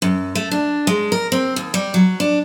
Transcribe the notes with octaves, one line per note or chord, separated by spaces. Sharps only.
F#2
A3
D4
G#3
A#4
C4
D#2
G3
F#3
D4